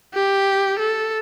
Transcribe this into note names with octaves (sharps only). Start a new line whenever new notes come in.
G4
A4